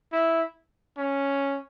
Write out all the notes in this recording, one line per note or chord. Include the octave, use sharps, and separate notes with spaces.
E4
C#4